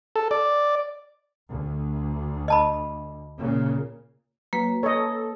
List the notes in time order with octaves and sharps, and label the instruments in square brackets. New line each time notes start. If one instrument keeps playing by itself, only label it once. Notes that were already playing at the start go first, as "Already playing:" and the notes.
[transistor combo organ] A4
D5
[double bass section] D2
[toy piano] D#5 A5 B5
[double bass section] A#2 C#3
[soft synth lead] F#3 [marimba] A#3 B4
[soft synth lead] A4 [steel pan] C#5 D#5